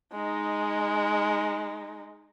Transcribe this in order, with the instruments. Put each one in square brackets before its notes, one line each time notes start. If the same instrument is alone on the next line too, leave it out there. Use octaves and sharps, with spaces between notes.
[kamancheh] G#3 D#4